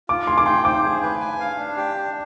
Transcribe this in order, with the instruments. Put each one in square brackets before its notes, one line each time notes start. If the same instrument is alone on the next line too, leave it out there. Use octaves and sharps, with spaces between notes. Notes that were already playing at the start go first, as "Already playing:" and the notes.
[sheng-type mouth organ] F4 [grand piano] D6
[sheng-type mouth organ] G#4 [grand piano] C6
[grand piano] D6
[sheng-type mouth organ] G5 [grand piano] C6
[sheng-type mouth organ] C5 [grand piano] D6
[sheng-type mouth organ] G#4
B4
G#5
F5
D4
G4
D4